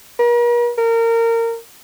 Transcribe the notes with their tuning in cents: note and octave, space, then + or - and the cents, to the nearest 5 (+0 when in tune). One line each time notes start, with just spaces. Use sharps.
A#4 +45
A#4 -25